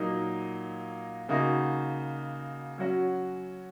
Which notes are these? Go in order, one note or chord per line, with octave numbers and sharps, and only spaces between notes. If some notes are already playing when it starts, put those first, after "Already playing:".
Already playing: A#2 F#3 A#3 D#4
C#3 A#3 D#4 F#4
F#3 C#4 F#4